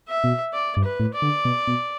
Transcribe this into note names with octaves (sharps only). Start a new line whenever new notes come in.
E5
B2
D5
G2
B4
A2
D5
D3
B2
B2